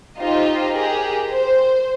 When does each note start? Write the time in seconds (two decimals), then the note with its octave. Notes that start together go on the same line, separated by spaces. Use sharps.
0.18 D#4 F4 G4 C5 D#5
0.75 G4 G#4 A#4
1.31 C5